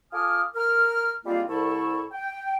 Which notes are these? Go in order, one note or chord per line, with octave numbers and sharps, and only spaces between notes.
F4 A4 G#5 D6 D#6 F6
A#4 F6
G3 G#3 A#3 C4 F4
C2 E4 A4 C#6
G5